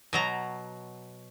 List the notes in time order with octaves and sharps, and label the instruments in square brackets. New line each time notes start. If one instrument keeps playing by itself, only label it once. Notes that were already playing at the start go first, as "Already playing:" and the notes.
[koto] B2 F#3 A#5